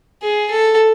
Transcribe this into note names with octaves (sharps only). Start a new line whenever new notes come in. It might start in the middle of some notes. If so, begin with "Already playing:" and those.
G#4
A4